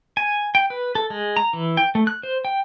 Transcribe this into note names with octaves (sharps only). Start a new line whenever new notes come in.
G#5
G5
B4
A4
G#3
A#5
E3
G5
A3
F#6
C5
G5